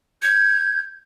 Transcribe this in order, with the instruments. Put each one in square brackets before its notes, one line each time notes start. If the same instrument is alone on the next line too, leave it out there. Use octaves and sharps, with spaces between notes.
[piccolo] G6 [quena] G#6